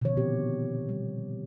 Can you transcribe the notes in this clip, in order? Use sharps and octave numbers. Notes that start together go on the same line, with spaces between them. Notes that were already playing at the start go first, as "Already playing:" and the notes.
B2 D3 D#3 F3 C#5
A#2 C4 G4
G3